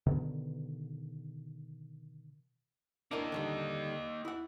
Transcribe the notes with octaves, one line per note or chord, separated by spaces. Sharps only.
B2 D3 D#3
A#3 D4 E4 A#4 D#5
D3 D#3 G3
E4 F#5